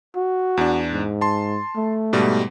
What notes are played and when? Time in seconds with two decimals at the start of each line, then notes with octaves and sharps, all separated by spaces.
0.16 F#4
0.57 E2 D4
0.92 G#2
1.21 A5 C6
1.76 A3
2.13 G#2 B2 G3